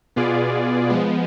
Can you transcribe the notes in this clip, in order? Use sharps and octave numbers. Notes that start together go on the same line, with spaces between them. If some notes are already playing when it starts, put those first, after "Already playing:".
B2 B3 F4 G#4 D5
F3 G#3 B3